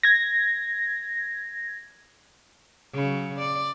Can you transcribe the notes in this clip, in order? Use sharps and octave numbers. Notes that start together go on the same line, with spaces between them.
G#6 A#6
C#3 F#3
D5